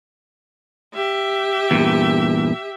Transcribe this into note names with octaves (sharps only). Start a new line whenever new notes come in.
G4 E5
E2 G2 A#2